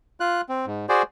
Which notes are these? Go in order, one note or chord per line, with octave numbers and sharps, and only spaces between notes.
F4 F#6
C4
G#2
F#4 G#4 C5 D5